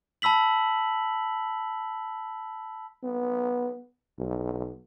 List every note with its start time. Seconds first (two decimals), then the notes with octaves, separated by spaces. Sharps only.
0.22 A5 B5 E6 B6 F#7
3.03 B3
4.19 B1